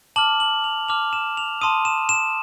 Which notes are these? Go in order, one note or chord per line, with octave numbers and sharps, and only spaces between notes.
A5 D6 F6 F#7
F#7
F7
A5 D6 F6 F7
E7
F7
A5 C6 D#6 D#7
E7
E7